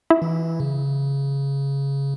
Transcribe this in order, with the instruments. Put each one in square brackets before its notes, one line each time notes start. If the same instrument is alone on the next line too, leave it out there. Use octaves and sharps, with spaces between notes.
[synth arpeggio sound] E4
[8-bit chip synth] E3
C#3